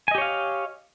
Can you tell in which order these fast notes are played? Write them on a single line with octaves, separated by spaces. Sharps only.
G#5 D#5 G4 C#5 F5